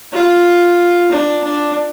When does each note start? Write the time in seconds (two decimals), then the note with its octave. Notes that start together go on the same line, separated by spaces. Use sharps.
0.13 F4
1.11 D4
1.44 D4